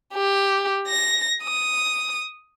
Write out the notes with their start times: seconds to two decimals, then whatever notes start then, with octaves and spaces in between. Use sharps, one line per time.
0.14 G4
0.88 A#6
1.43 D#6